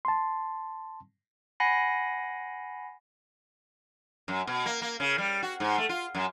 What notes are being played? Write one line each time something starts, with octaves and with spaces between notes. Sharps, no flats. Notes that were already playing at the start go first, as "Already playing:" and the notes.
A5 C6
F#5 G#5 B5 A#6 C7
F#2
B2
A#3
A#3
C#3
G3
F#4
G#2
A3
F4
F#2